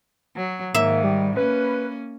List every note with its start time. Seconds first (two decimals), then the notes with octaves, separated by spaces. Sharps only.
0.36 F#3
0.75 G#2 D#3 A#3 E5
1.04 G3
1.37 A#3 C#4 B4